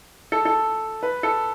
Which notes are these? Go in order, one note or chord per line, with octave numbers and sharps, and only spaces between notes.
A4
A4
B4
A4